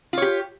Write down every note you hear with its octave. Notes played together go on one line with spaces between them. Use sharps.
F4 G4 C#5